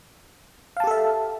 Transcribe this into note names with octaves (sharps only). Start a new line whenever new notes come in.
G4 A4 E5 F5 A5